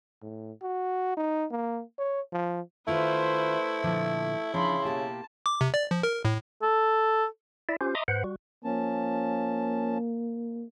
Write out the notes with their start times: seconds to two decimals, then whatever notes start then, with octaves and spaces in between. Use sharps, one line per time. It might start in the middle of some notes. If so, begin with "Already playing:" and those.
0.22 A2
0.62 F#4
1.17 D#4
1.51 A#3
1.99 C#5
2.32 F3
2.88 D#3 A3 E4 F4 B4 C5
3.83 A#2 D3 F3
4.54 C#3 F3 D4 B5 C6
4.85 B2 A#3 G4 A5
5.46 D6
5.61 C3
5.74 D5
5.91 F3
6.03 A#4
6.25 A2
6.62 A4
7.69 E4 D5 E5
7.81 C#4 F4 G4 C5
7.95 D#5 E5 A#5 C6 D6 D#6
8.08 G#2 B4 C5 F#5
8.24 G3 F#4
8.65 F3 A#3 C#4 A5